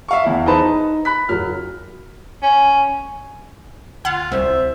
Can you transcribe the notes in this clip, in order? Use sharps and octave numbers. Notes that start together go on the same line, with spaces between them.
E5 F5 C#6
E2 E4
D#4 G#4 B4 C5 A5 B5
D#4
B5 F#6 B6
F#1 F#3 F6
C#4
D2 F4 F#5
C2 C5 E5